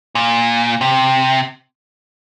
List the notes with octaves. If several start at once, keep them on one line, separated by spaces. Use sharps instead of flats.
A#2
C3